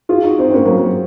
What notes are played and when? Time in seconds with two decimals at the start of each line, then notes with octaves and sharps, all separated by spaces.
0.09 F4 G#4
0.23 D#4 F#4
0.39 C4 D#4
0.50 C4
0.54 A#3 C#4
0.65 F#3 A#3
0.77 F#3 A#3